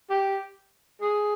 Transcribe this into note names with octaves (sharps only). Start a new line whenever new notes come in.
G4
G#4